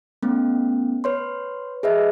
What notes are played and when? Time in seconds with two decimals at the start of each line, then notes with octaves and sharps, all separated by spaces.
0.23 A3 B3 C#4
1.04 B4 C#5 C6
1.83 G#4 B4 D#5 E5